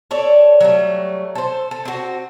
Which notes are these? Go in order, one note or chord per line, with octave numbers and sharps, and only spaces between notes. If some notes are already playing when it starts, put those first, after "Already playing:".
A4 C#5 D5
F#3 G3 A3
A4 C5
A4
C4 F#4